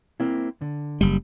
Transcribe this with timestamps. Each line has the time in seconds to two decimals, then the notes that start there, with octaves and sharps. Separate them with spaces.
0.20 A#3 C4 E4
0.61 D3
1.01 F#1 G3